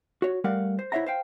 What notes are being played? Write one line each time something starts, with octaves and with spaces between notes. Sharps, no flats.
F#4 C#5
G3 A3 A#4 F5 F#5
C5
E4 C5 C#5 E5 F#5 A#5
C5 F5 G5